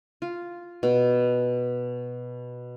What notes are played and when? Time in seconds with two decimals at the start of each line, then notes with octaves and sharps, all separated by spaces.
0.22 F4
0.83 B2